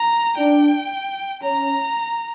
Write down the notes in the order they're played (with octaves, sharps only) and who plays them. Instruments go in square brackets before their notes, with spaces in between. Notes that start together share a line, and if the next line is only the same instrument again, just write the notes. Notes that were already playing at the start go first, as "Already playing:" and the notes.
Already playing: [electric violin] A#5
[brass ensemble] D4 [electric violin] G5
[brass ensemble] C#4 [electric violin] A#5